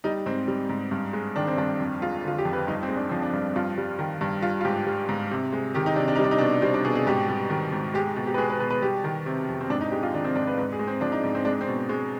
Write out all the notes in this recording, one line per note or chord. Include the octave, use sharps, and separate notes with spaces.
G3 D#4
G#2 C4
G3
G#2
G2
G#3
D#3 D4
C4
G2 D4
F2
G#3 F4
D3 F4
G4
F2
B4
G2 D#4
C4
G#3
D4
F3 C4
D4
G2
G2 F4
G3
D#3
G2
G3 F4
F4
G#2 G4
G3
G#2
C3
G#3
D#3 G4
D#4
C3 D4
D4
D#4
G3 D4
D#4
B2 D4
G3 C4
D4
B2 G#4
G#4
G#2 G4
G3
D#3
G#2
G#3 G4
B2
G4
B4
G#3 G#4
B4
B2 B4
B4
G3 G4
D#3
C3
F2
C4
G#2 D4
D#4
G#3 G4
F4
D#3 D4
C4
G#2 D4
B4
G#2 B4
G#4
G#3
C4
F3 D4
D#4
G#2
C4
G#3 D4
C4
B2
G#3